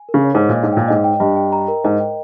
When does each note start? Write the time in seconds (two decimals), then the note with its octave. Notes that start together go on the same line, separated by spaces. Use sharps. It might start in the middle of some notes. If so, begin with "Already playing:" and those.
Already playing: G#5
0.09 A#4
0.14 C#3
0.24 C#5
0.35 G#2
0.40 C#5
0.49 A#2
0.56 D#5
0.63 G#2
0.73 A#2 G5
0.88 G#2 D#5
1.04 G5
1.20 G2 D#5
1.36 G5
1.52 A#5
1.68 A#4
1.84 G#2 D#5
2.00 G5